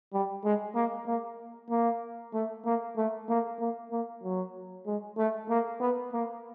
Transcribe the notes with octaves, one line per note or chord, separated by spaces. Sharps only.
G3
G#3
A#3
A#3
A#3
A3
A#3
A3
A#3
A#3
A#3
F#3
G#3
A3
A#3
B3
A#3